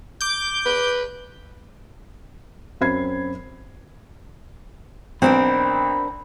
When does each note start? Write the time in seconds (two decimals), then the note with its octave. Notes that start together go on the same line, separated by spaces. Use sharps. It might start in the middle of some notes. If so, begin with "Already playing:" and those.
0.21 D6 G6
0.66 B4
2.81 F#2 C4 B5 G#6 C7
5.22 B1 C4 D4 A#4 B5